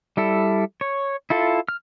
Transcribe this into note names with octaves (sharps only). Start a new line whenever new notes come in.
G3 E4 A4
C#5
E4 F4 A4
F6